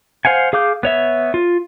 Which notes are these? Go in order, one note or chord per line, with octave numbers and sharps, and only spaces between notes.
C5 F5 F#5 G#5
G#4 F5 D6 G6
B3 C#5 E5
F4